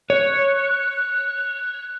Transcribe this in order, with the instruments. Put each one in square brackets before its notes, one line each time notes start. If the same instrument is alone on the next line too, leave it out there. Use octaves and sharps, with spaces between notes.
[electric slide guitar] C#5 [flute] F#6